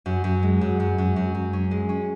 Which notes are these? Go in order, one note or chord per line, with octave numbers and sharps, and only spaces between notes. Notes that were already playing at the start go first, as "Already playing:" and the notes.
F#2
F#2
G#3
F#2
F#2
F#2
F#2
F#2
C#4
G#3
C#4